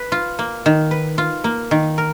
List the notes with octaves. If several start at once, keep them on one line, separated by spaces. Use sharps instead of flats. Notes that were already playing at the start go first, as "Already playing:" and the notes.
Already playing: B4
F4
A#3
D#3
B4
F4
A#3
D#3
A#4